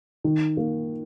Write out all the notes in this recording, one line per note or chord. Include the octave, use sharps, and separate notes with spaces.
D#3
A#3